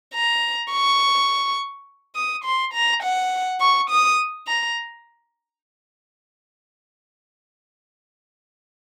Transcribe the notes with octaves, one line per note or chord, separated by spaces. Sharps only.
A#5
C#6
D#6
C6
A#5
F#5
C#6
D#6
A#5